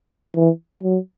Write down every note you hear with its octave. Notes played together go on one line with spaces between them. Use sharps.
E3
F#3